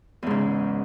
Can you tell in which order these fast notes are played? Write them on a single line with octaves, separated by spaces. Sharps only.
E2 G#2 C#3